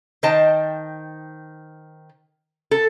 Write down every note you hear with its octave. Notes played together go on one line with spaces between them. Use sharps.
D#3 C5 D#5 G5 A5
A4